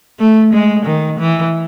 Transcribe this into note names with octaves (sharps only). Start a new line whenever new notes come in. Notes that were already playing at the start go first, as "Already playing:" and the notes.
A3
G#3
D#3
E3